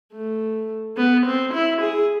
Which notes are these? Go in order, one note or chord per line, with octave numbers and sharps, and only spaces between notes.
A3
B3
C4
E4
G#4